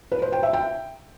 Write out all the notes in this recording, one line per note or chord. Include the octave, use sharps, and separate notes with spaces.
B4
C5
G5
E5
G5